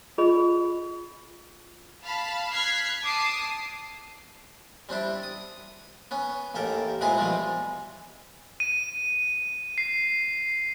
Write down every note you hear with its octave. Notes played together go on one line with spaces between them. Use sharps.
F4 G#4 D#5 B5
F5 A5 B5 F6
F6 F#6 G#6 B6 C7
A5 D6 D#6 C7
G3 C4 D4 E4
D#6
B3 C#4
A1 D#2 G4 A4 A#4
A#2 G#3 B3 C4 E4 G#4
B2 E3 F3 G3 G#3
D#7
C7